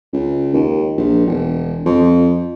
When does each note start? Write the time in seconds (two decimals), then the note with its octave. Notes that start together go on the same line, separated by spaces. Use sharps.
0.13 C#2
0.53 D#2
0.97 A#1
1.27 E1
1.85 F2